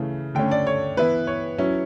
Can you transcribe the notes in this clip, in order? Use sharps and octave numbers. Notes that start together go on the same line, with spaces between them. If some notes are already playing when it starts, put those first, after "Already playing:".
Already playing: C#3 E3 A3
D3 A3 C#4 G5
D5
C#5
E3 B3 E4 B4
C#5
F#3 C#4 E4